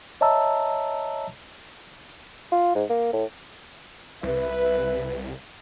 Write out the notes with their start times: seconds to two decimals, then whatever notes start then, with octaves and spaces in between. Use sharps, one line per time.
0.21 C#5 D#5 E5 A5 A#5 E6
2.52 F4
2.75 G#2
2.90 A#3
3.13 A2
4.23 C2 B4 E5